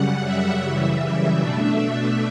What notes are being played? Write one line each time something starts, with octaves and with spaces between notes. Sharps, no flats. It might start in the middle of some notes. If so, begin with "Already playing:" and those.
Already playing: F#2 C#3 G3 F#5
E5
F#2 C#3 E3 G3
B2 A3 D4 E5
E5